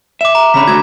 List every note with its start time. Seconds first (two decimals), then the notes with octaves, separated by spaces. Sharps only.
0.21 E5 D6 E7
0.35 A#5
0.54 C#3 C#4 D4 B5 B6
0.68 D3 A3 F#4 G#6